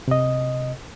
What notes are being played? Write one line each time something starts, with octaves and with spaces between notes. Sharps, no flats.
C3 D#5